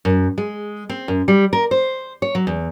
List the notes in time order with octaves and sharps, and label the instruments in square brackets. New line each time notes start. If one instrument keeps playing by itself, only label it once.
[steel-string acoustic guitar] F#2
G#3
C4
F#2
G3
A#4
C5
C#5
F#3
E2